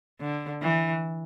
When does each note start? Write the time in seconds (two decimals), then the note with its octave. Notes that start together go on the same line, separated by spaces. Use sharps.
0.21 D3
0.62 E3